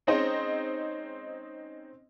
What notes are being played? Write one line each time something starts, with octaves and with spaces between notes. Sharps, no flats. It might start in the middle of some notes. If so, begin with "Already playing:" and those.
G#3 C4 C#4 D#4 C5 D#5